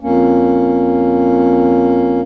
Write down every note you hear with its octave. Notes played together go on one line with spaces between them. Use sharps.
F2 A#3 C#4